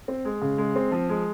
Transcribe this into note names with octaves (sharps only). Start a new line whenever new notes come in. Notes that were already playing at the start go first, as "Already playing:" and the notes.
C4
G#3
C#3
G#3
C4
F3
G#3